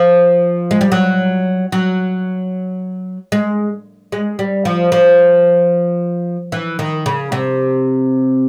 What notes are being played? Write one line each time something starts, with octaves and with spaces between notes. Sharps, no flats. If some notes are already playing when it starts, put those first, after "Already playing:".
Already playing: F3
G#3
G3
F#3
F#3
G#3
G#3
G3
F3
F3
E3
D#3
C#3
C3